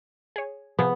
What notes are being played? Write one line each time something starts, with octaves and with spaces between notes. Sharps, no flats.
G#4 C#5
C3 F3 B3 G#4